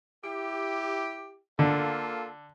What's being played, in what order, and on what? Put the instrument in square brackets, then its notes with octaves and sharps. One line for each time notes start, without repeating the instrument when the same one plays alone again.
[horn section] E4 G4
[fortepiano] D3 [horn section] A#3 F4 A4